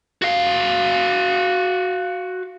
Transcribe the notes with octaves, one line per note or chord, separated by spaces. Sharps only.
F#4 F5